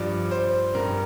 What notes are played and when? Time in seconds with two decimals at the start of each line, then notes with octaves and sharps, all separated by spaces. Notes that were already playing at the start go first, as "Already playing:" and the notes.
Already playing: G2 F3 D5
0.31 C5
0.75 G2 G3 A#4